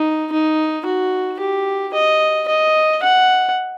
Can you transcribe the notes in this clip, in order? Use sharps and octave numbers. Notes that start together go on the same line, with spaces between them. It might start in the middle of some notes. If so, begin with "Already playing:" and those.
Already playing: D#4
D#4
F#4
G4
D#5
D#5
F#5